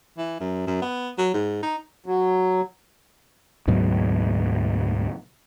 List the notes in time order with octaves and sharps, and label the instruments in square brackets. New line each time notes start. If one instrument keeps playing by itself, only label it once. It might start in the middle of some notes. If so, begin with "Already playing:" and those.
[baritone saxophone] E3
F#2
F#2
B3
F#3
G#2
D#4
[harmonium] F#3
[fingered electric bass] D2 G#2 B2 F#3